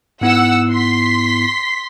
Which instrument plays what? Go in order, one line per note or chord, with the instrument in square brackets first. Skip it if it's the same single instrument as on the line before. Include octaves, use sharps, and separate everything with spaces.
[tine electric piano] G#2 B3 E4 [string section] F#5 E6
[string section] C6 B6